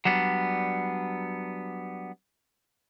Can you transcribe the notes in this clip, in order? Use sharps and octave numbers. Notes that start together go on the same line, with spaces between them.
F#3 G3 B3 D4